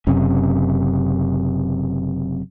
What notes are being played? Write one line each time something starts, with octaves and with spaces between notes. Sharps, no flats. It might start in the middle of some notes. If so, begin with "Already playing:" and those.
F#1 F#2 C3 C#4